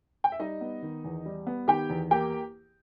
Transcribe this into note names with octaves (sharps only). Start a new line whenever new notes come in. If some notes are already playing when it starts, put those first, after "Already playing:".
G5
E5
G3 D#4 D#5
B3
D#3
E2
G3
B3
D#3 G4 G5
E2
A#3 G4 G5